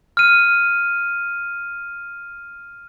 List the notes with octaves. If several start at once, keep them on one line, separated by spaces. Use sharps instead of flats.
F6 D#7